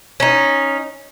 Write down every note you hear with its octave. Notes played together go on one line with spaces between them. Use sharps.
C#4 D#4